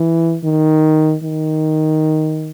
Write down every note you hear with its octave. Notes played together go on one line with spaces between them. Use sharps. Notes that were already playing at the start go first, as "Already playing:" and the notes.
Already playing: E3
D#3
D#3